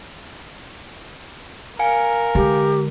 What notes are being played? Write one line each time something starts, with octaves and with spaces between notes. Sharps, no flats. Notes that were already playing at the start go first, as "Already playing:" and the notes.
A#4 F5 G#5 C#7
D3 G#3 G4